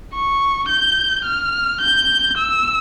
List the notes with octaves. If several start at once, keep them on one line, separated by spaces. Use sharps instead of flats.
C#6
G6
F6
G6
E6